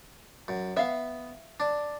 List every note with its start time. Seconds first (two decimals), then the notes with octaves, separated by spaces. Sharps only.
0.48 F#2
0.77 B3 E5 F5
1.60 D4